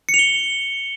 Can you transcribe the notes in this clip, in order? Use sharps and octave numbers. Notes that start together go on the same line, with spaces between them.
C#7
F7
G7